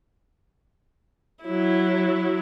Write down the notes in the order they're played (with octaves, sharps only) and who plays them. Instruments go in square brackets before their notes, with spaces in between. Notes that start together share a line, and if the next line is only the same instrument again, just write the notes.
[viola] F#3 E4